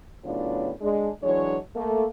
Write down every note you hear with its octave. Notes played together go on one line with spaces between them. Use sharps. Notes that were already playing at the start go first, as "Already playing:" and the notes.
A2 C#3 F#3 B3 D4 F4
G#3 D4
E3 F#3 G#3 D4 C#5
A3 A#3